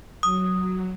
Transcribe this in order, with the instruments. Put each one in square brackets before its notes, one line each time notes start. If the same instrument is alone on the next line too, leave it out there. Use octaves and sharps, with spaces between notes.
[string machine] F#3 [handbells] D#6